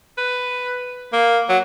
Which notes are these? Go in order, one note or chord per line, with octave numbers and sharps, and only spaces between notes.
B4
A#3
F#3